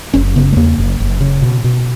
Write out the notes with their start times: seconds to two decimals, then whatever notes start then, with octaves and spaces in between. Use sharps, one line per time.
0.14 F#1 C#4
0.36 C#3 B3
0.53 A3
0.56 E2 A#3
0.78 F#1
1.00 F#1
1.21 C#3
1.42 B2
1.64 B2